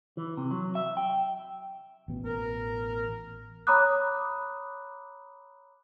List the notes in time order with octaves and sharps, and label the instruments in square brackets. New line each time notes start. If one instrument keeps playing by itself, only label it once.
[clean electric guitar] E3
C3
F#3
E5
G5
[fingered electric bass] A1 B2
[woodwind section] A#4
[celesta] C#5 A#5 B5 D6 D#6 F#6